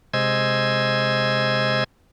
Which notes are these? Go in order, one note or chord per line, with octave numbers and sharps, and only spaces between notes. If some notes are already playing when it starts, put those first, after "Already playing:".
C3 G#3 C5 D#5 E6 G#6